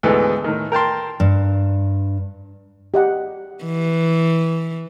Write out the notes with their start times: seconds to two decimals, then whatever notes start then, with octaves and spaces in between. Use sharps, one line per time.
0.03 D2 G#2 E3 B3 A4
0.44 A2 D#3
0.72 A#4 G5 A5 C6
1.20 G2
2.94 G4 D#5 F#5
3.64 E3